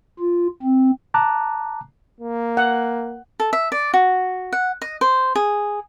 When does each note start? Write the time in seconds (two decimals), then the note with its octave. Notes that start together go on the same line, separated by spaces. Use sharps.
0.20 F4
0.63 C4
1.14 A5 A#5 D6 F#6
2.20 A#3
2.57 F#5
3.40 A4
3.53 E5
3.72 D5
3.94 F#4
4.53 F#5
4.82 D#5
5.01 C5
5.36 G#4